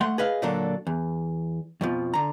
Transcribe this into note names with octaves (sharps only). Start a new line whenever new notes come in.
A3 F#5 C6
G#4 B4 D#5 F5
A#2 D3 F#3 A#3 D4 A4
E2
F2 B2 F3
D3 A#5